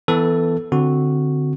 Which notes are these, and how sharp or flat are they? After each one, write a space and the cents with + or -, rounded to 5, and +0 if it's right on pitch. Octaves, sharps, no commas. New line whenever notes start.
E3 +0 B3 +20 A4 +5
D3 +0 C4 -20 F#4 -5